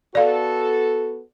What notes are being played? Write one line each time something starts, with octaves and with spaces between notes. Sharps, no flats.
B3 F#4 A4 D5 F5